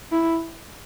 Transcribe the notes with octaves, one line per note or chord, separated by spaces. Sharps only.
E4